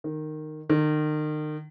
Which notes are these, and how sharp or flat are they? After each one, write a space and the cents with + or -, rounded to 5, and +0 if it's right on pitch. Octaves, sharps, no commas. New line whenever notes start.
D#3 -15
D#3 -35